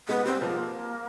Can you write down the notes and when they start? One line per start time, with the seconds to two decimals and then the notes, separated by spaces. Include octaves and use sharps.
0.08 G#3 B3
0.25 G3 C4
0.42 F3 A#3